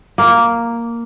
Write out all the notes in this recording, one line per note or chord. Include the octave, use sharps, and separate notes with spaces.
A#3